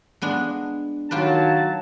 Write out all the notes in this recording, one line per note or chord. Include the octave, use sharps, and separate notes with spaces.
G#3 B3 D4
D#3 F#3 F4 G4 B4 A5